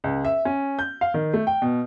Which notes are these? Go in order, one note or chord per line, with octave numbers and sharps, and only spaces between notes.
C#2
E5
C#4
G6
F5
D#3
A3
G5
B2